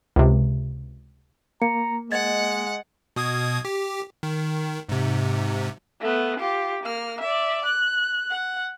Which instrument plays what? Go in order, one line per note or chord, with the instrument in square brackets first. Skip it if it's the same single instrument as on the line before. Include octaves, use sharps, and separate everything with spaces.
[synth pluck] C#2 C3
[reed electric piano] A#3 [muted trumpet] A#5 [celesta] C#7
[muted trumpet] G#3 [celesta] D#5 G#6 A6 [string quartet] F#5
[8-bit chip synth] B2 D#6 G#6
G4
D#3
G#2 C3
[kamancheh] A3 B3
F4 G4
A#3 F6
D5 E5
F#6
F#5